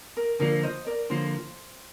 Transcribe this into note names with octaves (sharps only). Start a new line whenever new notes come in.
A#4
D3 F3 A#3 A#4 D5
C5 D#5
A#4 D5
D3 F3 A#3 C5